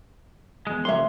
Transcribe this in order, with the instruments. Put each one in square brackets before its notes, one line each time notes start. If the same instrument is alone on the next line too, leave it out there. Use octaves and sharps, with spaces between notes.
[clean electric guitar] E2 G#3
[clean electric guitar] C#2 C6 [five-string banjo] F#3 A#3 E5